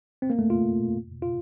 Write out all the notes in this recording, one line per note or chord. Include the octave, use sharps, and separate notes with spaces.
C4
A#3
A3
F4
F4